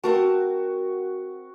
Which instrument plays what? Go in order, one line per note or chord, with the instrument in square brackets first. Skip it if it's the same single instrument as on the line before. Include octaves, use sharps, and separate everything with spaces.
[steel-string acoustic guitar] C4 A#4 A5 [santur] F#4